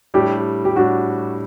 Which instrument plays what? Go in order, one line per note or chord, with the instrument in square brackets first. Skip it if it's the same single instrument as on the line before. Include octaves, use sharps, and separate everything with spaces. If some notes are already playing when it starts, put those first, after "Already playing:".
[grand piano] A2 G3 D4 [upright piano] G4
[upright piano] G4
[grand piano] A2 G3 D4 [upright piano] F#4